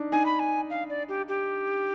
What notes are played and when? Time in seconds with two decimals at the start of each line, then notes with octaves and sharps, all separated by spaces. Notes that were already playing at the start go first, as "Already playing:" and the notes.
Already playing: D4 D#4
0.12 D#4 G#5
0.26 B5
0.39 G#5
0.70 F5
0.90 D5
1.09 G4
1.28 G4